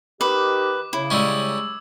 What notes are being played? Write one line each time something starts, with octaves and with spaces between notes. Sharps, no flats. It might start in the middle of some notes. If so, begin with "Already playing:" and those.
D#3 G4 B4 D6
C#3 E4
G3 G#3 C#4 E6 G#6